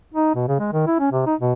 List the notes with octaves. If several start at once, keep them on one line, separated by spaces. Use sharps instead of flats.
D#4
B2
C#3
G#3
D#3
E4
C#4
C3
D#4
B2